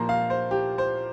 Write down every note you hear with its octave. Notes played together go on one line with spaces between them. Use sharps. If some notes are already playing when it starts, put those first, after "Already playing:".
Already playing: A#2 F3 A#3 A#5 C6
F5
C5
G4
C5